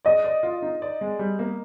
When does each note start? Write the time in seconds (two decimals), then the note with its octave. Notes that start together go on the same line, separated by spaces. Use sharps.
0.05 D5 D#5
0.24 D5
0.43 F4
0.62 D#4
0.82 D5
1.01 G#3
1.19 G3
1.39 A#3